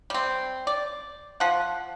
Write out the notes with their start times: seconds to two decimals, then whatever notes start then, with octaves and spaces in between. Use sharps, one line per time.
0.10 G3 C4
0.67 D5
1.40 F3 F#5